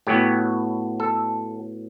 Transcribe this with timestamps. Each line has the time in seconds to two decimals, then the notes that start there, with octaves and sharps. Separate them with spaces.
0.07 A2 F#3 B3 G4
1.00 A4